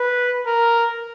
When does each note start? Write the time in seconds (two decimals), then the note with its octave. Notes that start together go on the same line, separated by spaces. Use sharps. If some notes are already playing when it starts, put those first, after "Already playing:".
Already playing: B4
0.47 A#4